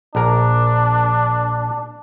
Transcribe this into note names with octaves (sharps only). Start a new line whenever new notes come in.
A#1 D4 A#4